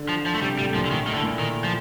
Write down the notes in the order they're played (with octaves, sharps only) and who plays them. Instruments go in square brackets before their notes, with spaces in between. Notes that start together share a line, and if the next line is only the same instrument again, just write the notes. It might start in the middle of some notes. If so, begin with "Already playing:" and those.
Already playing: [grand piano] D3
[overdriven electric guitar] F3
F3
A3
[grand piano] C3 [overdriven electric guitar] G3
[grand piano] A2 [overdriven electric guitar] G3
[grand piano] A2
[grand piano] A#2 [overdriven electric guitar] F3
[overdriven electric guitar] D3
[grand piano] A2 [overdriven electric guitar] D#3
[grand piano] A2 [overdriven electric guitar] D#3
[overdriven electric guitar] D3
[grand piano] A#2
[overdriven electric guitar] D#3
F3